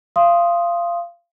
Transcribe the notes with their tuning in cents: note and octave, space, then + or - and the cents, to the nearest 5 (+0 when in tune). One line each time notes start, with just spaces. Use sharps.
F5 -20 C6 +10 D#6 +0